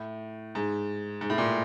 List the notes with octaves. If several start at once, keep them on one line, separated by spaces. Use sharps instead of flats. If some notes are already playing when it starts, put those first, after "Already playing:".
Already playing: A2
G#2
G#2
A2
A#2